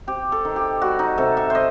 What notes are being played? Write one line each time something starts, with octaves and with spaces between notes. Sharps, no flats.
C4 G4
A4
D#3
G4
G3 F#4
D#4
C3 A4
E5
C5 D#5